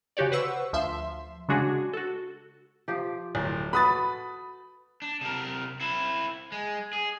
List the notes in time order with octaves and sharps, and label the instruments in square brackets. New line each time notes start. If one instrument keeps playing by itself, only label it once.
[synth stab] C#3 F#4 G4 C#5 D5
B4 C5 F#5 C#6 E6
D2 F3 E5 C6
C#3 G#3 D4 F#4 G#4
F#4 A4
[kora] F3 G4
[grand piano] D1
[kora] F#4 A4 B4 [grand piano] B5 D#6 A6
[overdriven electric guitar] D4
C3 A#4
C4 E4
G#3
G#4